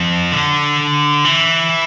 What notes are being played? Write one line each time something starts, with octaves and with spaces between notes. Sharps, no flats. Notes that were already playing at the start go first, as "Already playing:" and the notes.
Already playing: F2
D3
E3